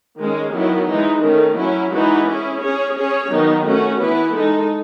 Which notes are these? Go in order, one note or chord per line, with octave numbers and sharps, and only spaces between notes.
D#3 G#3 C#4
D#3 F#3 B3 E4
E3 G#3 D#4
D#3 A3 C#4
F#3 C#4 E4
E3 G#3 D#4 F#4 B4
C#4 E4 G#4
C#4 G#4 C#5
C#4 G#4 C#5
D#3 F#3 B3 D#4
A3 C#4 F#4
E3 B3 E4 B4
G#3 D#4 A4